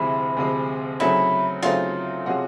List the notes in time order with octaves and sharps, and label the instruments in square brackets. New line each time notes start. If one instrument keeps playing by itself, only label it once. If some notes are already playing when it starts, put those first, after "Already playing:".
Already playing: [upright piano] D2 C3 F3 G#3 [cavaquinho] E4
[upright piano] D2 C3 F3 G#3
[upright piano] C#3 F#3 A3 C4 D#4 [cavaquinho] E4
[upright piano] C#3 F#3 A3 C4 D#4 [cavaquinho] F4
[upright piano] C3 F3 G#3 C#4 F#4